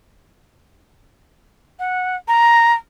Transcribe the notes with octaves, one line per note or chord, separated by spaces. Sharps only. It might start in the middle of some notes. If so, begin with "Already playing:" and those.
F#5
A#5